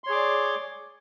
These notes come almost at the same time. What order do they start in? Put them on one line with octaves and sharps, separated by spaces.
C6 C#5 G#4 D6 D5